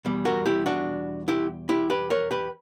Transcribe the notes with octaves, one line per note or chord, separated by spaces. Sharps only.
E2 B2 G3
F#4 A#4
E4 G4
D4 F#4
E4 G4
E4 G4
G4 B4
A#4 C#5
G4 B4